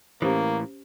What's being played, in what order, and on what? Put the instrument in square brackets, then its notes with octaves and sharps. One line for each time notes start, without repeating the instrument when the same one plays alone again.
[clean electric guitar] A2 E3 [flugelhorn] A#3 [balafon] C#4 G4 C5